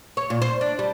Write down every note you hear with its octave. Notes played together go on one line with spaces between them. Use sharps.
C#5
A#2
C5
D4
G3